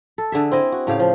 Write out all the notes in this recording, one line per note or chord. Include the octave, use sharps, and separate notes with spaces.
A4
D3 G#4 E5
C4 E4 D#5
F#4
A2 C#3 G4 F5
F3